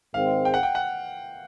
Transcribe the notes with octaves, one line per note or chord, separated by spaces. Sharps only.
G#2 D#3 G#3 C4 F5
G5
F#5
G5
F#5